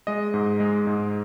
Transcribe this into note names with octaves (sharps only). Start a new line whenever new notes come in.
G#3 D#5
G#2
G#3
G#2